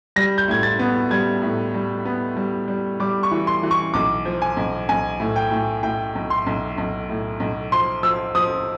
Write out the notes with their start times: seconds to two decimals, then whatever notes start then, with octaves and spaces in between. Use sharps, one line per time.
0.16 G3 A#6
0.38 G6
0.48 A2 G#6
0.63 A6
0.79 B3
1.11 G3 G#6
1.42 A2
1.74 G3
2.05 B3
2.37 G3
2.68 G3
3.00 G3 D6
3.23 C#6
3.31 E3
3.47 C6
3.63 E3
3.71 C#6
3.94 B1 D6
4.25 F3
4.42 G#5
4.57 B1
4.89 B1 G#5
5.20 A2
5.36 G5
5.51 A2
5.83 A2 G5
6.15 B1
6.30 C6
6.46 B1
6.78 B1
7.09 A2
7.40 B1
7.72 F3 C6
8.03 F3 E6
8.35 F3 D#6